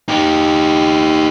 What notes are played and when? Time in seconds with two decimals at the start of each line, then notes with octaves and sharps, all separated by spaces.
0.08 D#4 G4